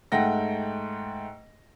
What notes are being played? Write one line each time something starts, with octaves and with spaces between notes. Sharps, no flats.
G#2 A3 F#5 G5 A#6